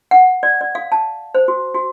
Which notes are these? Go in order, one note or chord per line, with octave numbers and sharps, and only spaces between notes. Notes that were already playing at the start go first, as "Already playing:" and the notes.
F#5
D5
D5
F5
A5
C5
F#4
F#4